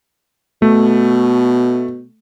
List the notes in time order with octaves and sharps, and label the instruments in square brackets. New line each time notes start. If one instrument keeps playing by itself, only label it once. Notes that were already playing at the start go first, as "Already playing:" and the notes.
[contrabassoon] B2 [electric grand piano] A3